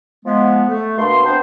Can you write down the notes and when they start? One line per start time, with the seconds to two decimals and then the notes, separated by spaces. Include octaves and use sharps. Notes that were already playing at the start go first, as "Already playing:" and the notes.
0.25 F3 G#3 B3
0.68 A3
0.98 B2 A#3 D4 C6
1.23 B3 C4 D4 C5